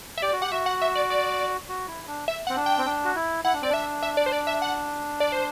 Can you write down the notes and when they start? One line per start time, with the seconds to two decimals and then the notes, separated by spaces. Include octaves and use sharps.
0.17 E5
0.22 G4 D5
0.33 F#4
0.41 G4 F#5
0.52 F#4 E5
0.66 F#5
0.81 E5
0.95 D5
1.10 D5
1.69 F#4
1.88 E4
2.07 D4
2.28 E5
2.47 F#5
2.49 C4
2.56 D4
2.66 G5
2.78 C4
2.86 D4
3.05 F#4
3.15 E4
3.44 E4 F#5
3.53 D4
3.62 C4 D5
3.69 D4 E5
4.02 E5
4.17 D5
4.26 C5
4.32 D5
4.47 E5
4.62 F#5
5.20 D5
5.32 C5